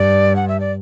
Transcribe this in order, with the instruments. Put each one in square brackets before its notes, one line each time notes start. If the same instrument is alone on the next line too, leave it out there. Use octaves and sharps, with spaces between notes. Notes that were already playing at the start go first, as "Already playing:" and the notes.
Already playing: [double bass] G2 [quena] D5
[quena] F#5
E5
D5